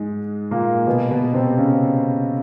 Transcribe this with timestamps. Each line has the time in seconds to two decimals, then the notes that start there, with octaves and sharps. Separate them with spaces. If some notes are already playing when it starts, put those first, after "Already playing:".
Already playing: G#2 G#3
0.51 A#2 A#3
0.87 B2 B3
1.11 B2 B3
1.34 C3 C4
1.58 C#3 C#4